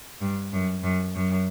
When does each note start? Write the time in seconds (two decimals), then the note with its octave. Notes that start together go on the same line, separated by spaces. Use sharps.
0.21 G2
0.53 F#2
0.83 F#2
1.15 F#2